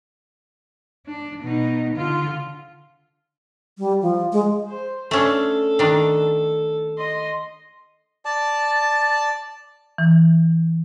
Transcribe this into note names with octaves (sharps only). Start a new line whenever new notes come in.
D4
B2 D#4
D3 F4
G3
F3
G#3
C5
A3 C#4 D4 A4
D#3 D4
D#5 C6
D5 A5
E3